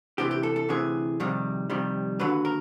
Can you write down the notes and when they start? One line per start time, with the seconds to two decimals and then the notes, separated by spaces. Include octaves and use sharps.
0.18 D2 C3 E3 G4
0.31 G4
0.43 A4
0.56 A4
0.69 D2 C3 E3 G#4
1.20 F2 C3 D#3 G3
1.70 F2 C3 D#3 G3
2.19 D#2 D3 F#3 B4
2.45 A#4